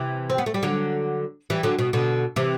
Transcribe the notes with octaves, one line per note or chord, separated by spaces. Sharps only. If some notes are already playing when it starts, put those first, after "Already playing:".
Already playing: C3 E3
C4
B3
A3
G3
D3 F#3
E3 G3
D3 F#3
B2
B2 D3
C3 E3